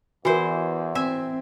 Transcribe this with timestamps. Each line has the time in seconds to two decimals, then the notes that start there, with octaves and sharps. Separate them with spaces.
0.25 E2 E3 F#4 A#4 C5
0.95 C4 E5 G#5